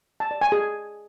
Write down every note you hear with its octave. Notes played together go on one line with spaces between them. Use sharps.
A5
D5
G#5
G#4